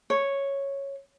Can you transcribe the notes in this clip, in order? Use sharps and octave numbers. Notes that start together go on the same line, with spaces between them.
C#5